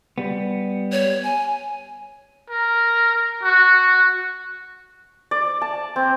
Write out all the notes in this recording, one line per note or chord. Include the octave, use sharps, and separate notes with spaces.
G3 B3
C#5
G#5
A#4
F#4
D5
A5
C4